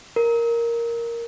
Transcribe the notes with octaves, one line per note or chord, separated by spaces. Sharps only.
A#4